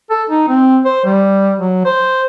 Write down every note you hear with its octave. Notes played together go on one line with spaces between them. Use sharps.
A4
D#4
C4
C5
G3
F#3
C5